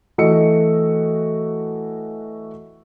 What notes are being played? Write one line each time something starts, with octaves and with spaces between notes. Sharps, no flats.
E3 A3 F#4 D#5 E6 C#7